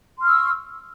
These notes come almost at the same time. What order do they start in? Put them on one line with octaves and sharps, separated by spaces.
C6 F6 C#6 E6